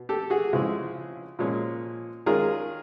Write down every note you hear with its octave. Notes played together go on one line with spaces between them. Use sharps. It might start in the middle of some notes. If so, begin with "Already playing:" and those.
Already playing: B2
G4 A4
F#4 G#4
C#3 F3 G#3 C4 E4
A#2 F3 G#3 C#4
D#3 G#3 C#4 F4 G#4 A#4